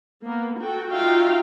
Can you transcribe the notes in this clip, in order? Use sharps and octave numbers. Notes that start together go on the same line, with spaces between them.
A#3 B3
F#4 A4 G5
D#4 F4 F#4 E5 F5 G5